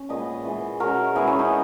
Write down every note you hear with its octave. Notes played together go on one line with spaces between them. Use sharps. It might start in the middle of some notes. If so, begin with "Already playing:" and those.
Already playing: C#4
A#2 G#3 B3 B4 D#5
E3 G#3 B3
B2 G#3 C#4 F#4 A#4
B2 G#3 B3 E4 G#4
C#4 E4
D#4